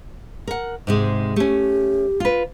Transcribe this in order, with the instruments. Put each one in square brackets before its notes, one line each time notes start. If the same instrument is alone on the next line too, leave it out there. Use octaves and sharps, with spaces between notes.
[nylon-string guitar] A#4 F#5
G#2 C3 G#3
[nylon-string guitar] A3 C#4 [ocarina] G4
[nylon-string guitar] F4 B4